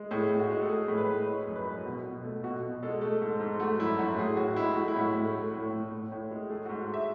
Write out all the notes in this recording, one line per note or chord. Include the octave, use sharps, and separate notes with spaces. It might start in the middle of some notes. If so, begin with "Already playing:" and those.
Already playing: G#3
A2 G#4
A2
F#4
G#3
A4
A3 G#4
A2
B4
A2
G#3 C#5
F#2
B4
F#2
B2
B2
A3
B2 F#4
B2
G#3 A4
A3 A4
G#2
G#2
A3 F#4
F#2 E4
F#2 F#4
A2 G#4
A2 F#4
G#3 E4
A3 F#4
E4
A2 F#4
A2
A3
A2
A2
A2
A2
G#3
A3 G#4
F#4
G#2
E5